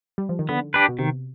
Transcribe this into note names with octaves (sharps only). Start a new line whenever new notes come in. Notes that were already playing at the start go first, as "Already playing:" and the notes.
G3
F3
D#3
D3 B3
D4 G4 B4
B2
C3 D#3